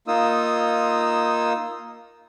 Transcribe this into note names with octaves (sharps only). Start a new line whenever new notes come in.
A#3 D#4 F4 D#6 E6